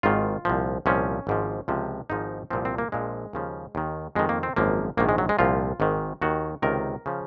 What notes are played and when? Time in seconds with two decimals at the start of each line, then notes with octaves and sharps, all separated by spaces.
0.03 G#1 G#2 D#3 F4
0.45 C2 A#2 F3
0.86 C2 A#2 F3 C#4
1.27 G#1 G#2 F3
1.68 C#2 C3 F3
2.10 G#1 G#2 F3 D#4
2.50 C2 A#2 F3 C4
2.65 C4
2.78 A#3
2.92 A#1 A#2 F3 G#3
3.33 D#2 C#3 F3
3.75 D#2 D#3
4.15 F2 D#3 G#3
4.29 A#3
4.43 C4
4.56 G#1 F#2 F3 A#3
4.97 A#1 G#2 D#3 A#3
5.09 G#3
5.18 F#3
5.29 G#3
5.39 C2 A#2 F3 F4
5.80 G#1 G#2 D#3
6.22 D#2 D#3 F#4
6.62 C#2 C3 D#3 A#4
7.06 C#3 F3